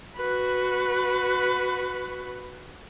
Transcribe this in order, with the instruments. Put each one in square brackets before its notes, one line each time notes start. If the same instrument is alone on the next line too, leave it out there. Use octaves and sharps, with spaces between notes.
[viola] F#4 B4